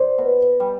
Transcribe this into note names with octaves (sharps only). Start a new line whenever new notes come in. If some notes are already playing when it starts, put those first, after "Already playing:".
Already playing: C5 D5
B2
G3